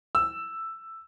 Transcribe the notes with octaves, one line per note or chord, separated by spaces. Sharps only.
E6